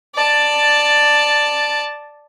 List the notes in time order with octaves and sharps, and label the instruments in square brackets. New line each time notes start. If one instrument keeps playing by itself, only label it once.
[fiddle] D5 A5